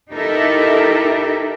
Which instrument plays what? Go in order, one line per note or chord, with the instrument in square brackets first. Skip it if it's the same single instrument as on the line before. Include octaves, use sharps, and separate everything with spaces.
[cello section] D#4 E4 G4 A4 A#4 E5